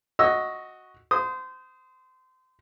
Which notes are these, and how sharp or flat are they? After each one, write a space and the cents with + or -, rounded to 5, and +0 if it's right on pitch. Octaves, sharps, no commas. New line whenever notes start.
F#4 +0 D#5 +10 E6 +0
C5 -25 D#6 +0